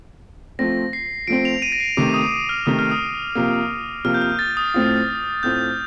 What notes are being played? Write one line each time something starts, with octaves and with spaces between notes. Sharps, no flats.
F3 A3 C4 A#6
C7
F3 A3 C4 D7
F7
D#7
A#6
C7
C3 D#3 A3 D6
D#6
F6
C3 D#3 A3 D#6
F6
D#6
C3 F3 A#3
C3 F3 A#3 F6
G6
F6
A6
D#6
A2 A3 C4 F4
A2 A3 C4 F4 G6